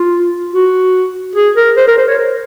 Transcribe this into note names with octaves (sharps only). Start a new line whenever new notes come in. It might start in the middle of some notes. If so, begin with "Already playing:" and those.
Already playing: F4
F#4
G#4
A#4
C5
A#4
C5
C#5
A#4